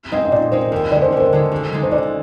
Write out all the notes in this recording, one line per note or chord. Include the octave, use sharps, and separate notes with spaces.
G#3 C4 D#4 D#5
D#5
A#2 D5
G#3 C4 D#4 C5
D#2 A#4
D3 G#3 D5
C5
D#2 A#4
C5
D3 G#3
D2
D3 G#3 D#4
C5
D2 D5